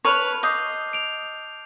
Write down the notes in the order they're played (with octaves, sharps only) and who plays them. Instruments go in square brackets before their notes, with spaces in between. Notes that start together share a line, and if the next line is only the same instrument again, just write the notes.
[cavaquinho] B4 C#5 [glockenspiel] A5 F6 F7
[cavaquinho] D#5 [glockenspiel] D6 G6 C7
[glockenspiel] D7 F7